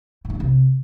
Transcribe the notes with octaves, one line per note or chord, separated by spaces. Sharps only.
G#2
A3
G3
C3